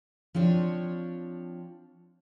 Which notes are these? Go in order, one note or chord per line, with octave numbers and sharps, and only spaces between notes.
F3 C4 D4 C#5